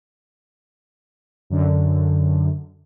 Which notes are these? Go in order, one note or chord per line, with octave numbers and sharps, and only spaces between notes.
F#2 D3